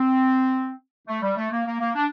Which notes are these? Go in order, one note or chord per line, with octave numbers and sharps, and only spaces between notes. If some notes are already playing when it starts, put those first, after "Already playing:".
Already playing: C4
A3
G3
A3
A#3
A#3
A#3
D4